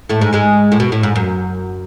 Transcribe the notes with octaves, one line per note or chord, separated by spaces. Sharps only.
A2 A3
G#2 G#3
G#2 G#3
A2
B2
A2
G#2
F#2